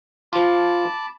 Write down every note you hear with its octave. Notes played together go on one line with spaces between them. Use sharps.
F3 F4 A5 B5 D6